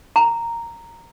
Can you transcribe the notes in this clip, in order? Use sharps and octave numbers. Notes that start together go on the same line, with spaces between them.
A#5